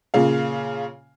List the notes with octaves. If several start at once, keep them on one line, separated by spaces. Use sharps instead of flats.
A#2 C#3 F5